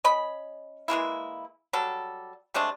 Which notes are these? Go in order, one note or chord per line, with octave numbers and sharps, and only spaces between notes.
C#4 D#5 B5
E3 G#3 A#3 E4
F#3 G3 A4
C3 G#3 A3 D4